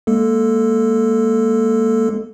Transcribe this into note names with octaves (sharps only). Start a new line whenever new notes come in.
G#3 A#3 A4